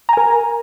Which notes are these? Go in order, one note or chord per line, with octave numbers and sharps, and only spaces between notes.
A#4 G#5 A#5